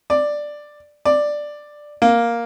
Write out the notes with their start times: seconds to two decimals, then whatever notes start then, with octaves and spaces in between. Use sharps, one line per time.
0.10 D5
1.05 D5
2.02 A#3